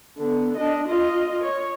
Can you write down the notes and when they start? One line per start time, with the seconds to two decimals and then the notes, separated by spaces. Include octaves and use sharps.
0.18 D3 B3
0.56 D4 D#5
0.88 F4 D#5
1.43 C#5